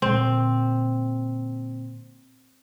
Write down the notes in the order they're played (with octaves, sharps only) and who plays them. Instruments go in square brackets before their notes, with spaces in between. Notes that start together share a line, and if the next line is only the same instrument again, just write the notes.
[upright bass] A#2 D3 [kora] C4